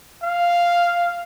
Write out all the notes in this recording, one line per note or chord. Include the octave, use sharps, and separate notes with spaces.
F5